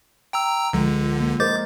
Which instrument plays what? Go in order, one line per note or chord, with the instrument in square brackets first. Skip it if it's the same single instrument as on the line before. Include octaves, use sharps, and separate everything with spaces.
[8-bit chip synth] G5 A#5 E6
[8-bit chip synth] C#2 D3 [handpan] F3 G#3
[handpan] A#3
[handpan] A#4 C5 D#5 [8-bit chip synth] D6 G6 A6